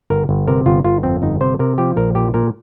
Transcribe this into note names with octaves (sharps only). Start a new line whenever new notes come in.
G1 A#4
G1
C3 A#4
G1 F4
G1 F4
F2 C4
G1 D#4
C3 C5
C3 A#4
F3 G4
A#1 A#4
A#2 G4
A#2 A#4